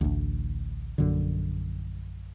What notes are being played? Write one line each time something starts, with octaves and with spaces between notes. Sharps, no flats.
A1 D2
A#1 F#2 D3